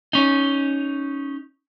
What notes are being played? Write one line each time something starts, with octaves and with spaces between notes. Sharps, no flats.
C#4 D#4